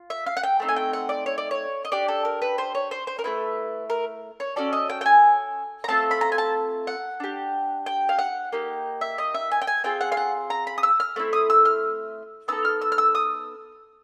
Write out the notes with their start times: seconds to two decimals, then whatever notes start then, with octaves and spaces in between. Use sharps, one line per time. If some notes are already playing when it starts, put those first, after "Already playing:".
Already playing: F4
0.10 E5
0.26 F5
0.37 F#5
0.43 G5
0.60 A3 C4 D#4
0.69 G#5
0.76 G5
0.93 F#5
1.09 D5
1.26 C#5
1.38 D5
1.51 C#5
1.85 D#5
1.92 D4 G4 D5
2.08 A4
2.25 A#4
2.42 B4
2.58 C5
2.75 C#5
2.91 C5
3.07 C5
3.19 A#4
3.24 A3 C4 E4 B4
3.90 A#4
4.40 C#5
4.56 C#4 F#4 A4 D5
4.73 D#5
4.89 G5
5.01 G5
5.06 G#5
5.84 A#5
5.88 A3 C4 F4 A4 A5
6.11 B5
6.21 A#5
6.32 G#5
6.38 A5
6.87 F#5
7.20 D4 G4
7.86 G5
8.09 F5
8.19 F#5
8.52 A#3 D#4 G4
9.01 E5
9.18 D#5
9.34 E5
9.52 G#5
9.62 G5
9.67 G#5
9.84 C4 F4 G#4 G5
10.01 F#5
10.12 F5
10.17 F#5
10.50 A#5
10.67 B5
10.78 D#6
10.83 E6
11.00 F6
11.16 A3 C4 E4
11.33 D#6
11.50 E6
11.65 F6
12.48 B3 D#4 A4 E6
12.65 F6
12.81 E6
12.92 F6
12.98 E6
13.15 D#6